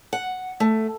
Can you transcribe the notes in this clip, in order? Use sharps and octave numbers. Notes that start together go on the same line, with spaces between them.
F#5
A3